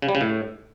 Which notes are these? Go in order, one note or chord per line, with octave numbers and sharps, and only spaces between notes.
C#3
G3
C#3
A2